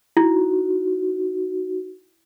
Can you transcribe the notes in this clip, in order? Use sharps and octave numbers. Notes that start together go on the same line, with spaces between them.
D#4 E4 F#4